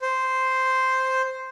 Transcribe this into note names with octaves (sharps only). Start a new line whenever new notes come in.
C5